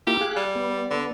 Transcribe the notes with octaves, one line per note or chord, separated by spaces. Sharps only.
A#3 E4 F4 G4
G#4 F5 F#6
G3
B3
D3